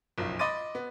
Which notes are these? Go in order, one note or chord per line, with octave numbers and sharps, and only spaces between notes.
F#1 B1 F3
D#5 B5 C6 D6 A6 D#7
B3